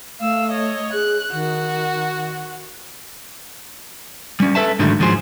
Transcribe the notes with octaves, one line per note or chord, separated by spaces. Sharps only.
A3 F5 E6
C#5 D#5
G#4 F#6
D#3 F#4
G3 C#4
A4 B4 E5 A5
G#2 D3 D#3 F#3 A3
D#2 G#2 F3 F#3 G#4 C5